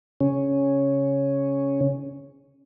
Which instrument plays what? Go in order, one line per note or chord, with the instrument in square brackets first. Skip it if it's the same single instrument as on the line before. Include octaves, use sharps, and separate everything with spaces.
[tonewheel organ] C#3 C#4